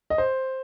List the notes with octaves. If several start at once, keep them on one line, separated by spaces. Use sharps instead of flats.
D#5
C5